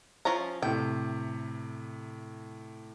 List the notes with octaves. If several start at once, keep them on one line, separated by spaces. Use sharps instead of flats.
F3 C#4 A#5
A2 C3 G5